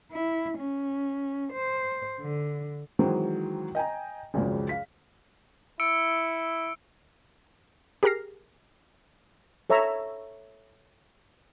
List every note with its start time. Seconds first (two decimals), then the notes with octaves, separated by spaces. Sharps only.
0.12 E4
0.58 C#4
1.53 C5
2.21 D3
2.99 D#3 E3 F#3 G#3 C4
3.75 D#5 G5 G#5 A#5
4.34 G#1 C#2 F#2 C#3 F3 G#3
4.69 F5 B6
5.80 E4 E6 C#7 D7
8.03 G4 G#4 A#4 F6 A#6 C7
9.70 A4 C#5 E5 A#5 C#6 E6